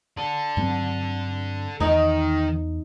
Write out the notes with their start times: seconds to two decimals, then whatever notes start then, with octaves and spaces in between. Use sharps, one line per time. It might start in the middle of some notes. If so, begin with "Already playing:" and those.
0.17 A4 D5
0.57 G2 F#3 C4
1.80 E2 D#3 D#4